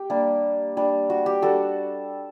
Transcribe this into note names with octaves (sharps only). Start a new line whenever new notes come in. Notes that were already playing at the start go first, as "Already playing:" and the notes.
Already playing: G4
G3 A#3 D4
G3 D4
F#4
G4
G3 D4 F#4 A4